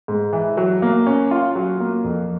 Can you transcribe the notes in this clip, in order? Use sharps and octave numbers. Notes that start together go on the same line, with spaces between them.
G#2
E3
F#3
A#3
C#4
F4
F#3
A#3
F2